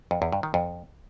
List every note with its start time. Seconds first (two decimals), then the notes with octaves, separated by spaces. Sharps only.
0.11 F2
0.22 E2
0.32 G2
0.43 D#3
0.54 F2